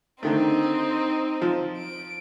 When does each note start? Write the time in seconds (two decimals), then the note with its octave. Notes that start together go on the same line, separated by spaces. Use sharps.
0.23 D3 D#3 A3 C4 D#4
1.42 F3
1.77 D7